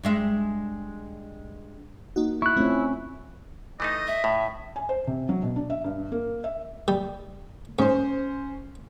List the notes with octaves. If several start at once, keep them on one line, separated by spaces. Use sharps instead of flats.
G2 G#3 E5
A#3 D#4 F#4
E4 C#6 F#6
A3 C4 C#4 F4
E3 A3 D#4 D#5
E5
A2
G#5
C5
C3
F#3
B2
D4
E5
G2
A#3
E5
G3
G#2 C#4 C5